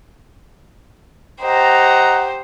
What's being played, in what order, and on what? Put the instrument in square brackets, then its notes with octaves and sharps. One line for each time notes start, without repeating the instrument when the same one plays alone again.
[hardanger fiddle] G4 C5 [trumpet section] D#5 F#5 A#5